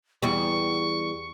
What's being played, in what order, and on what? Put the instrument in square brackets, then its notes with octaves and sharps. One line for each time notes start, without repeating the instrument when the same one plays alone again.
[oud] E2 G3 [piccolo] C#6